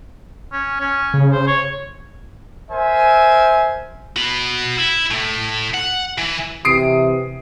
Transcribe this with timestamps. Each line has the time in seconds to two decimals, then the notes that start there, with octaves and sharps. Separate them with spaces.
0.52 C#4
0.80 C#4
1.14 C#3
1.32 C5
1.47 C#5
2.71 A#4 C5 E5 G#5
4.16 F#4 B5
4.78 E4
5.11 A2 A3
5.74 F#5
6.18 E3
6.65 C3 E3 D#6 C7 D7